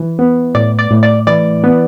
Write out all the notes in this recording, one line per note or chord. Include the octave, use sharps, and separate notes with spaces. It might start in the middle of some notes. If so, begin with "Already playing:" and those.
Already playing: E3
B3
A2 D5
D5
A2
D5
E3 D5
B3